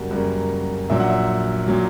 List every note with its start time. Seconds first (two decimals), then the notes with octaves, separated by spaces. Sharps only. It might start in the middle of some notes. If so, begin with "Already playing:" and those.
Already playing: F#2 C#3 G3 A#3 F#4
0.11 F#2 C#3 G3 A#3
0.90 A#1 A#2 F#3 E5
1.00 F#5
1.10 E5
1.68 A#2 F#3